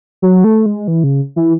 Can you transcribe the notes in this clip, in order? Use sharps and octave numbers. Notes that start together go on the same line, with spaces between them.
F#3
A3
G#3
E3
C#3
E3